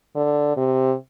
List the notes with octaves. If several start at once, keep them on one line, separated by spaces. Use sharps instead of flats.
D3
C3